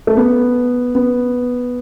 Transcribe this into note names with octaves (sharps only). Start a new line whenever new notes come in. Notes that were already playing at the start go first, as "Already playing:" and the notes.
A3
B3
B3